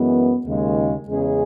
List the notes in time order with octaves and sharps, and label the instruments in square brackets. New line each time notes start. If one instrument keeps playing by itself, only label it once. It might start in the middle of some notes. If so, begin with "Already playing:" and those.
Already playing: [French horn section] F#2 E3 G#3 B3
D#2 C#3 G#3
E2 C#3 G#3 C#4 G#4